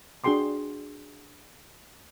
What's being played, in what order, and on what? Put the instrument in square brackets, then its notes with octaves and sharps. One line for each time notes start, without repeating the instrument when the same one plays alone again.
[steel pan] D4 F#4 G#4 G5 C6 D6